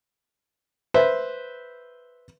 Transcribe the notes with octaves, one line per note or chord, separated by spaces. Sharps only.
B4 C5 E5